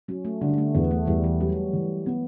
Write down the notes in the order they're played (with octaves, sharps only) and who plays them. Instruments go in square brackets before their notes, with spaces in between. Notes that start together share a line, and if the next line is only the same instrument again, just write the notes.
[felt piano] F#3 [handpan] C#4
[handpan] A3
[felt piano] D3 [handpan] G3
[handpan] A3
[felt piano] E2 [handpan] B3
[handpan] A3
[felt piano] E2 [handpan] G3
[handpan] E3
[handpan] F#3 [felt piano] G3
[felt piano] E3
B3